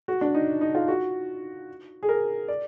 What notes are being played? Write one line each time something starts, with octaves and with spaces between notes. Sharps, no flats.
F#4
D4
D#4
D#4
F4
F#4
G#4
A#4
D5